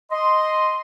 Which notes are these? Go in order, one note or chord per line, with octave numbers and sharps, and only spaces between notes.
D#5 C6